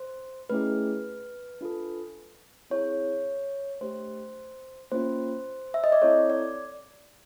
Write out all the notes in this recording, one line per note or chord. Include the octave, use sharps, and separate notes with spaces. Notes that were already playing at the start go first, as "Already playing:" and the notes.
Already playing: C5
A3 C#4 E4 G#4 B4
D4 F4 A4
C4 E4 G#4 C#5
A3 D4 G4 C5
A#3 C#4 F4 C5
E5
D#5
D5
C4 E4 A4 C#5
D5